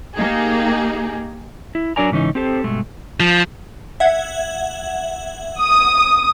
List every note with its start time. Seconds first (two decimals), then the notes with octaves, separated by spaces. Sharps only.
0.15 A#3 D#4 G4 G#4
1.75 E4
1.96 F#3 D4 A#4 D5 G#5 A#5
2.11 G#2 C#3 E3 C#4 D#4
2.35 C4 G4 A4 C5
2.64 G2 B2 G#3 A3
3.20 F3
4.00 E5 F#5 G#6
5.62 D#6